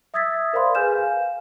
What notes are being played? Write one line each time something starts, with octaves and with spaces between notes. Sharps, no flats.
E5 D#6 E6 G#6 A6 B6
A#4 C5 D5 F5 B5 C6
G#4 B4 G#5 F6 G6 E7
F5 G#5